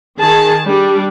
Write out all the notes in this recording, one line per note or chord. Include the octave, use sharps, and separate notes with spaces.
D#3 G#4 A5
G3 D4